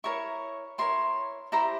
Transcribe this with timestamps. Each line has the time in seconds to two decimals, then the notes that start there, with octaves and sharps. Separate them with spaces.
0.04 E4 A#4 C#5 C#6
0.78 E4 A#4 C#5 C6
1.52 E4 G4 C5 A#5